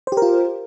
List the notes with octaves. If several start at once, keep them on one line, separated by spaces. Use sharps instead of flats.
F4 G4 A#4 C5